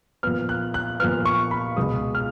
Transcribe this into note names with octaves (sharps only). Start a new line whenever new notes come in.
A#2 F3 B3 F6
F#6
F#6
A#2 F3 B3 F6
C#6
B5
C#2 B2 G#3 D#6
F6